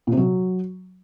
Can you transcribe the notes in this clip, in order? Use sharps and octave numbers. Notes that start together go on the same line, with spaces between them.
A#2
C3
F#3